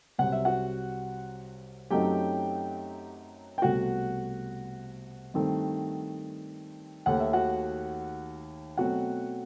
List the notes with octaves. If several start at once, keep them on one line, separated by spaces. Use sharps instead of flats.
C2 C3 F#3 F#5
E5
F#4 F#5
F#2 F#3 A3 C4 D#4 G4 G5
G5
C2 B2 A3 F#4 F#5
G2 D#3 A3 C4
D#2 D#3 A3 F#5
E5
F#4 F#5
B2 F#3 A3 C4 F#4 F#5